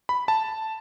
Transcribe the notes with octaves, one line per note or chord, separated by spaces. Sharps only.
B5
A5